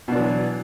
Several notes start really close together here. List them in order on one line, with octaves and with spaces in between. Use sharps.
B2 D4 F#3 E3